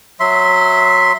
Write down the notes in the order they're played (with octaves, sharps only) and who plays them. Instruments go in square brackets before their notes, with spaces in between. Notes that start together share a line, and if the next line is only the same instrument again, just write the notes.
[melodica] F#3 E5 C6